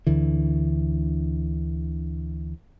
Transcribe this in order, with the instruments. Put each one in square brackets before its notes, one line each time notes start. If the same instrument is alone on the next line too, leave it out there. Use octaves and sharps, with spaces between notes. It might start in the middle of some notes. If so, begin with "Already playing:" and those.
[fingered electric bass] D2 D3 E3